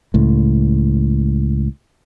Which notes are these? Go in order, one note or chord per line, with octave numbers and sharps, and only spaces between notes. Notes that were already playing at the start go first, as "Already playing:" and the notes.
C#2 A2